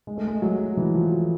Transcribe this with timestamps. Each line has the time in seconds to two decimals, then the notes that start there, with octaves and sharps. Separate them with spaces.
0.07 G#3
0.18 A3
0.27 G#3
0.42 F#3
0.77 E3
0.95 F3
1.12 F#3